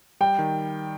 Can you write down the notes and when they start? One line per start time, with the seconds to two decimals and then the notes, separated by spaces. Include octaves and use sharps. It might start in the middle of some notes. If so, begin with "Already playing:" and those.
0.20 G3 G5
0.39 D#3